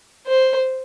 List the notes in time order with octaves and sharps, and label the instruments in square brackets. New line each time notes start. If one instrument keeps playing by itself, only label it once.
[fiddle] C5